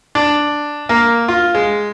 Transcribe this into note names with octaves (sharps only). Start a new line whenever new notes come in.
D4
A#3
F4
G#3